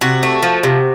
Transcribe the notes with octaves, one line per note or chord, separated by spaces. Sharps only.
C3 F#4
A3
F3
C3